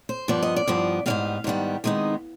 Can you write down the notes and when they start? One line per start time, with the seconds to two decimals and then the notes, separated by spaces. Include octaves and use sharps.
0.09 C5
0.28 G2 F3 B3 D5
0.43 D#5
0.56 D5
0.67 G2 F3 B3
1.06 G#2 D#3 G3 B3 F5
1.44 G#2 D#3 G3 B3
1.84 C3 D#3 G#3 B3 D#4